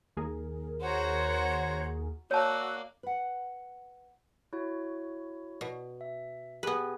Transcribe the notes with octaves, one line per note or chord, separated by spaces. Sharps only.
D#2 G#4 A#4
F#4 C5 C#5 F#5 A#5
A#3 F#4 C#5 D5 A5 E6
B4 F#5
E4 F#4 C#5
B2
E5
B3 G4 G#4 B4 G#5